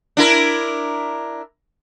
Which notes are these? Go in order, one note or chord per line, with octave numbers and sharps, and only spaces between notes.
D4 E4 A#4